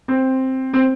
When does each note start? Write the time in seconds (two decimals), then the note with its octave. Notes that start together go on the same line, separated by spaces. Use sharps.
0.08 C4
0.73 C4